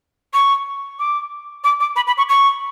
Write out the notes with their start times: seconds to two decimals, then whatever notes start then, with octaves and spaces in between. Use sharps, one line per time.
0.34 C#6
0.99 D6
1.64 D6
1.80 D6
1.96 B5
2.07 B5
2.18 C#6
2.29 C#6